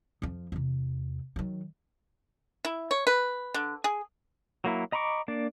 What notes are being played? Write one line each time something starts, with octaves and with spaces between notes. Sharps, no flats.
F2 F3
E2 C3
D#3 F#3
E4
C#5
B4
D3
G#4
F#3 A#3 E4
D#5 A#5 B5 C#6 D6
A#3 D4 D5